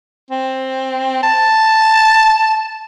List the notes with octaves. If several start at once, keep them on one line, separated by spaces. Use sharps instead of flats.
C4
A5